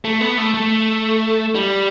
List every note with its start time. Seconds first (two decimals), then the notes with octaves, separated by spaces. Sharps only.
0.05 A3
0.21 B3
0.38 A3
0.54 A3
1.55 G3